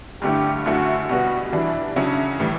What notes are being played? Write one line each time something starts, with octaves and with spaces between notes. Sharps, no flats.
G2 D3 A3 E4 G4
F#2 D3 A3 E4 F#4
B2 G3 B3 F#4
E3 G3 D4 E4
C#3 F#3 C#4 D4 E4
A2 E3 G3